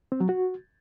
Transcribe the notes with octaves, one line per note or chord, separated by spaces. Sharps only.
C4
F#3
F#4